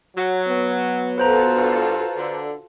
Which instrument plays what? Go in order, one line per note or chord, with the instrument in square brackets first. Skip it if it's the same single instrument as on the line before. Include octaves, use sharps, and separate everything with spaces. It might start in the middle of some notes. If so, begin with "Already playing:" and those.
[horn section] F#3
[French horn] B3
[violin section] F4 F#4 A4 [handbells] B4 C5 A#5
[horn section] G2
D3